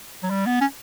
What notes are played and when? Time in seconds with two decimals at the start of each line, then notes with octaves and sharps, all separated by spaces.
0.23 F#3
0.30 G3
0.46 B3
0.61 C#4